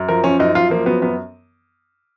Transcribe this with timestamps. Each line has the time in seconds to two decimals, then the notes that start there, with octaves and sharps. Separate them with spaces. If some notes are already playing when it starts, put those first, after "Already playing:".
Already playing: F#2
0.08 F3 A#4
0.24 F3 C#4
0.39 F#2 D#4
0.55 F#2 F4
0.70 F3 A#3
0.86 F#3 B3
1.02 F#2 B3